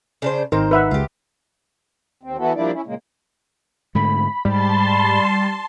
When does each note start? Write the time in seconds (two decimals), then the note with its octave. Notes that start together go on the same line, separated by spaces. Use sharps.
0.22 C#3 D4 C5
0.52 G#1 C4 D#4 A#4 C5 G5
0.71 B4 E5 F#5
0.91 C#2 C#3 F4 G4
2.23 D#2 C4
2.39 E3 B3 E4 F#4 A4
2.55 F3 G3 A#3 D4 E4 D5
2.73 C#4 E4
2.86 A#2 C#3 G#3 A#3
3.95 G#2 D3 A3 B5
4.45 G#2 G3 A5 C6